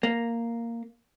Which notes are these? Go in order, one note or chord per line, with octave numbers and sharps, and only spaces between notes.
A#3